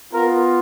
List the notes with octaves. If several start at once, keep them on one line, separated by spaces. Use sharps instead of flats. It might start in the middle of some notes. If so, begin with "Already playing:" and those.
B3 F4 A#4